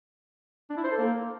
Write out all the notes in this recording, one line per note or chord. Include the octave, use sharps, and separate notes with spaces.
D4
E4
C5
A4
A#3